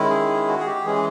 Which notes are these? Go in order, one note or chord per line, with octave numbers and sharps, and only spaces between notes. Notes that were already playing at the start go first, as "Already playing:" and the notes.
Already playing: D#3 G#3 C#4 E4
G#4
F#4
G#4
G4
E3 G#3 C#4 G#4